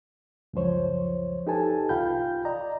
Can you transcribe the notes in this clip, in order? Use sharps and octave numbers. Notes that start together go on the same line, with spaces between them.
C#2 F#2 F3 C5 C#5
D#4 G4 A4 B4 G#5 A5
C2 F4 F5 G5 B5 G6
D5 D#5 A#5